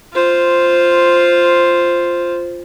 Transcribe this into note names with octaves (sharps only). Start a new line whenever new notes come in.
F4 C5